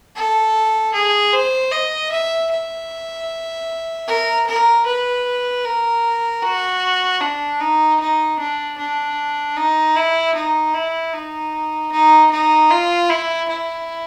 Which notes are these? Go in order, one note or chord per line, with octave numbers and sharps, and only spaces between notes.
A4
G#4
C5
D#5
E5
E5
A#4
A#4
B4
A#4
F#4
D4
D#4
D#4
D4
D4
D#4
E4
D#4
E4
D#4
D#4
D#4
F4
E4
E4